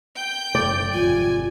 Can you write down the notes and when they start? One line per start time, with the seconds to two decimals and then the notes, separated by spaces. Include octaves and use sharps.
0.15 G5 G6
0.55 F#1 A3 D5
0.93 G#1 F2 C3 F4 G#5